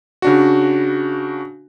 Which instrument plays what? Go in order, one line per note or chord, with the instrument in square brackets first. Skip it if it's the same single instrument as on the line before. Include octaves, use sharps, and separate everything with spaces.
[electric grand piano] C#3 D4 F#4